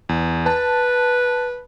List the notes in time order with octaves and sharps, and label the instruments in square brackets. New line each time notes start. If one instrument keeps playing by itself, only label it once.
[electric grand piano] E2
[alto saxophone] B4 [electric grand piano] A5